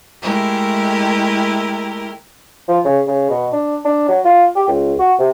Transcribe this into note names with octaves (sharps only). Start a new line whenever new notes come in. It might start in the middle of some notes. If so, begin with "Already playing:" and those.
G#3 A3 E4 G4 A#4
F3
C#3
C#3
B2
D4
D4
F#3
F4
G4
C#2
F#4
C3